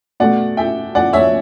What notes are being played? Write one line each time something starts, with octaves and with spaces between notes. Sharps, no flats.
B2 A3 D5 F#5
E5 G5
D5 F#5
C#5 E5